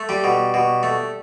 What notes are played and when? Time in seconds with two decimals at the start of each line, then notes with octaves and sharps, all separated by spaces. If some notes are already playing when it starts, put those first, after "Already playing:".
Already playing: A3
0.09 G3 G4
0.24 B2
0.54 B2
0.83 A3